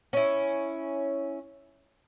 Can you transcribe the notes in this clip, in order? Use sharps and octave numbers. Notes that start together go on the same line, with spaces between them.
C#4 E4